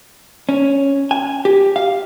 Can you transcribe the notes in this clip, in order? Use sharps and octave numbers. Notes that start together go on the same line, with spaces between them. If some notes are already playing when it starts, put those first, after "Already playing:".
C#4
G#5
G4
F5